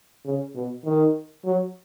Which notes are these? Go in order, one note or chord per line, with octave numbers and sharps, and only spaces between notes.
C#3
B2
D#3
F#3